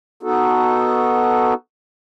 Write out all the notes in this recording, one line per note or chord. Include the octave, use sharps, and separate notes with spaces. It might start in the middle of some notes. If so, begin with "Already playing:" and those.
B3 D#4 F#4 A4